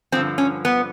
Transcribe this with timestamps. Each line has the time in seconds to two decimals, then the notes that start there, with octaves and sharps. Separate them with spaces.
0.12 G2 D3 F3 C4
0.38 C#4
0.65 B3